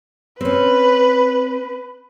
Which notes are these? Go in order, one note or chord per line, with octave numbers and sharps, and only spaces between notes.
C4 C#4 B4